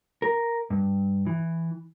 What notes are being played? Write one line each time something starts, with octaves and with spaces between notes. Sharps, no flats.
A#4
G2
E3